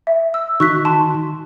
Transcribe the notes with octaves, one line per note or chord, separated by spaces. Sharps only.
E5
E6
D#3 D#4 F#4 C#6 F#6 B6
A5 C6